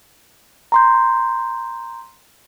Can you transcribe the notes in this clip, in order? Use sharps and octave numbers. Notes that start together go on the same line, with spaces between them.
A#5 C6 G6